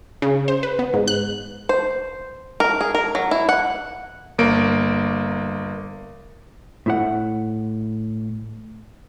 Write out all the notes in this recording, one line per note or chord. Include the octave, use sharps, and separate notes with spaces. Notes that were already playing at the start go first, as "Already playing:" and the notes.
C#3
C5
B4
B3
G#2
F#6
C5
A#4
G#4
A#4
F#3
E4
F#5
G1 A#3 D7
A2 E4 F#5